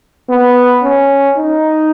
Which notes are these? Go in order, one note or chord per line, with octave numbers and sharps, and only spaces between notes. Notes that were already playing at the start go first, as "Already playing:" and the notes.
B3
C#4
D#4